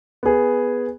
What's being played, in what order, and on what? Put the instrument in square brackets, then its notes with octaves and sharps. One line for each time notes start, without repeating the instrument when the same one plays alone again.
[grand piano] B3 G#4